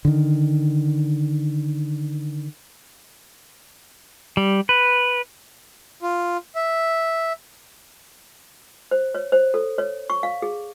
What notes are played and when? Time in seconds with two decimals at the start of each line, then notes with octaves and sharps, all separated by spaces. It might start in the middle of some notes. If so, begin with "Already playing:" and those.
0.05 D3 D#3
4.37 G3
4.69 B4
6.02 F4
6.55 E5
8.91 C5
9.15 C#5
9.32 C5
9.54 A4
9.78 C#5
10.10 C#6
10.23 F5
10.42 G#4